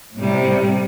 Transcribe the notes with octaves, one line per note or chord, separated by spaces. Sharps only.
A2 C3 G3